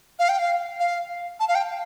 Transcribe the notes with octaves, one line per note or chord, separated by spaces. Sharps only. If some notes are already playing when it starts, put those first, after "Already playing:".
F5
G5
F5
F5
A5
F5
G5